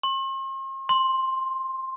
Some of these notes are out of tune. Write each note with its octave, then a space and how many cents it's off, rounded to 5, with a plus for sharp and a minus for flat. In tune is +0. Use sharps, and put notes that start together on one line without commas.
C6 +45
C6 +10